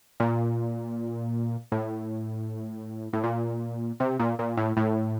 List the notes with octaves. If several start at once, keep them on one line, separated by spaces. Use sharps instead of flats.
A#2
A2
A2
A#2
C3
A#2
A#2
A2
A2